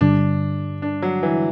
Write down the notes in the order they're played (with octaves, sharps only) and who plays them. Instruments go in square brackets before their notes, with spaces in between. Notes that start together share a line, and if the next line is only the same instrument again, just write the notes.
[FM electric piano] G2 D3 G3 [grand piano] D4
[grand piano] D4
F#3
E3